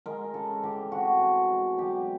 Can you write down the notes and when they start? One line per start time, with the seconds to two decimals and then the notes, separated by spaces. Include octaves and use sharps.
0.06 G#3 A#4
0.34 C#3 A4
0.63 E3 G4
0.92 C4 F#4
1.20 B2
1.49 G#3
1.78 F#3 G4